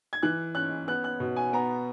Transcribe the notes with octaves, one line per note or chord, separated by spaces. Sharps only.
G#6
E3 F#6
C#4 F#6
B3 F#6
F#6
B2
G#5
B3 A#5